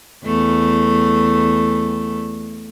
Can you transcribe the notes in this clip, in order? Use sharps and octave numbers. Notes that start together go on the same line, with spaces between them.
E2 A3